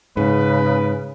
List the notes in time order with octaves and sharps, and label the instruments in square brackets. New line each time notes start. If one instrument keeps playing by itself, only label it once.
[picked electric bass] G#2 [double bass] C#3 [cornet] B4